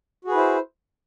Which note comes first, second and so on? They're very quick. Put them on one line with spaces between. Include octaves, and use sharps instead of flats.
F#4 G#4 B4 E4 C5